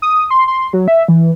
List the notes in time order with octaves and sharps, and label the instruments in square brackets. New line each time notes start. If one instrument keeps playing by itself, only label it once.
[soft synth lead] D#6
C6
C6
F#3
E5
E3